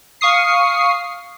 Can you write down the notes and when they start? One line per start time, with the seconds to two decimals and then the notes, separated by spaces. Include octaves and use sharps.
0.21 F5 C#6 D#6 C7